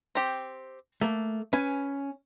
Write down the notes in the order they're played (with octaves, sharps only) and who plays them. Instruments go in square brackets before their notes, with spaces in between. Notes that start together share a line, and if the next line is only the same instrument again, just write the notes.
[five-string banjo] C4 G4
[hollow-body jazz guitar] A3 [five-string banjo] A#3
[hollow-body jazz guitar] C#4 [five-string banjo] B4 G#5